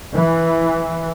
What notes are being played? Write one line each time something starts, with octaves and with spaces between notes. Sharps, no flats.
E3